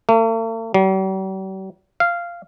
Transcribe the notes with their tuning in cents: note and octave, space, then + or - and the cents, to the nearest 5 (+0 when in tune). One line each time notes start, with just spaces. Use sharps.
A3 +45
G3 -45
F5 -10